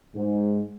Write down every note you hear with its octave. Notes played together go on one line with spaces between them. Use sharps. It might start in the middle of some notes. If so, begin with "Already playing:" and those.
G#2